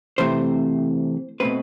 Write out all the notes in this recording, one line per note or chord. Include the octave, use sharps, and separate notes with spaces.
C3 E3 A3 C4 C5
B2 A3 C4 B4